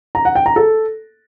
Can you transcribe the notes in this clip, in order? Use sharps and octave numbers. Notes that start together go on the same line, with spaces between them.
A#5
F#5
G5
A#5
A4